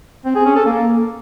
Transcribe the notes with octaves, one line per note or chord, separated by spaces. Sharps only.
C4
G#4
C#4
A4
A#3